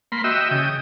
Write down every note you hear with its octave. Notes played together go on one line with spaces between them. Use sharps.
A#3 B5 C6
F#4 D#5 E5 G5 E6
C#3 G5 D#6